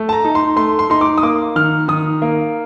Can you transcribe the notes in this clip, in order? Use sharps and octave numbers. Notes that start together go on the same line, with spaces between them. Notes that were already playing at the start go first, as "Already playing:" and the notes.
Already playing: A3
A5
A#5
D#4
C6
A3 C6
C6
D#4 C6
D6
D#6
A#3 D6
D#3 F6
D#3 D#6
A#3